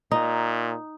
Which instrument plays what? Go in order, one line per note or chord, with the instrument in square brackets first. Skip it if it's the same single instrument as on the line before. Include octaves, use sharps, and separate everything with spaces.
[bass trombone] A#2 [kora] D#4